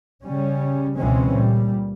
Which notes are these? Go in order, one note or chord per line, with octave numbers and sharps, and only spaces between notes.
C#3 G3 C#4
C#2 B2 E3 G#3 C4 C#4
A#2 G3